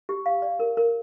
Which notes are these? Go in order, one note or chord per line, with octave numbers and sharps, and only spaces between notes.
G4
F5
D5
A#4
A#4